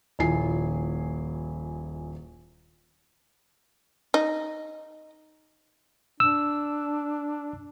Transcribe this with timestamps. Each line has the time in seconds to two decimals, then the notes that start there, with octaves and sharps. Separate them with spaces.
0.19 D#1 A#1 E4 G#5 C7
4.14 D#4
6.20 D4 E6